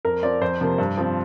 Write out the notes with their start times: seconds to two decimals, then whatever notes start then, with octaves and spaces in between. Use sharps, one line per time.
0.05 F2 A#4
0.23 F3 C4 D5
0.41 F2 C5
0.61 C3 F3 A#3
0.78 G2
0.97 F3 C4